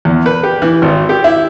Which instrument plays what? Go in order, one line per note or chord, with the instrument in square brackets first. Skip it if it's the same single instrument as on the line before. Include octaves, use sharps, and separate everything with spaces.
[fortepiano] E2
B4
G4
E3
G#1
G4
E4